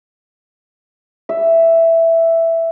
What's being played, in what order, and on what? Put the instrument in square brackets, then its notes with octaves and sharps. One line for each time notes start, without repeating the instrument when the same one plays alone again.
[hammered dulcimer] E5